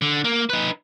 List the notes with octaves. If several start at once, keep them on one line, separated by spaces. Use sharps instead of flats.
D3
A#3
D#4 B4